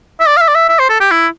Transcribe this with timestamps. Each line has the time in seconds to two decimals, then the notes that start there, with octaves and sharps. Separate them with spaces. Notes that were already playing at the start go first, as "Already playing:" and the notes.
0.20 E5
0.26 D5
0.37 F5
0.41 E5
0.48 D5
0.55 E5
0.69 E5
0.79 C5
0.90 A4
1.00 G4
1.11 E4